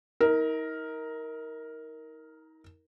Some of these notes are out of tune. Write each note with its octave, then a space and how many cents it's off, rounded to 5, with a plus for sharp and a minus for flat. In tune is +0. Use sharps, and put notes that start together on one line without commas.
D#4 +40 A#4 +0